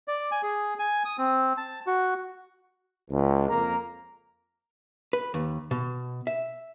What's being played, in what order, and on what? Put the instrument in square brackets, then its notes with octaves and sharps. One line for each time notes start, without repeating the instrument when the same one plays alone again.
[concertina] D5
G#5
G#4
G#5
D#6
C4
A5
F#4
[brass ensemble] C#2
F2 A#3 A#4 A#5
[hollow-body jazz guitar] B4
D#2
B2
E5